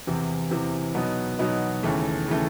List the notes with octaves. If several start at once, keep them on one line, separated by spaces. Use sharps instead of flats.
E2 C3 E3
E2 C3 E3
B2 F#3 B3 D#4
B2 F#3 B3 D#4
D#2 C#3 E3 A3
C#3 E3 A3